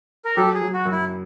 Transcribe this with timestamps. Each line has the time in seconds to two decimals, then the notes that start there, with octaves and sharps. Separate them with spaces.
0.25 A#4
0.36 F#3 G4 A4
0.55 G#4
0.61 F#3
0.74 F#4
0.85 F#2
0.92 E4